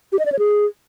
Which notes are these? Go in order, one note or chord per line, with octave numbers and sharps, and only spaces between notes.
G4
D#5
D5
C#5
G#4